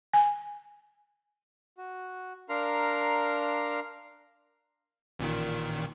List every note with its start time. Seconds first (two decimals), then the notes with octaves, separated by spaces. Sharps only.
0.13 G#5
1.78 F#4
2.49 D4 A#4 F5 A#5 C6
5.19 A1 A#2 D#3